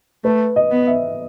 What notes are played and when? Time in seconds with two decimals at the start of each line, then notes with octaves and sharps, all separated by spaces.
0.24 A3 B4
0.56 D#5
0.71 B3
0.87 E5